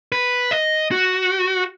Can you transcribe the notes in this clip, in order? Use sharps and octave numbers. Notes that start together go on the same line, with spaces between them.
B4
D#5
F#4